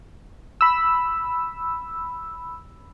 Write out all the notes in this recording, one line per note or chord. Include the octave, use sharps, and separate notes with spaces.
B5 E6